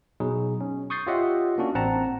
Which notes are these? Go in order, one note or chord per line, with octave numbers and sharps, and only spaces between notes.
B2 F#3 D#4 G#4
C#4
C#6 D#6 G6 A6 C7
F4 G4 C#5 D#5 E5 F#5
A#3 C#4 D4 F#4
A1 C4 F#5 A5 A#5